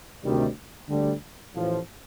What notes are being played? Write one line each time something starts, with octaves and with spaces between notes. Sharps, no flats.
D2 C3 D#3 G3
D2 D3 G3
A1 A2 F3